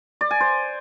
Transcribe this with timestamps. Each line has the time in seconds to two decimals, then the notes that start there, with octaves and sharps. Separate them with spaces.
0.21 D5
0.31 G#5
0.40 C5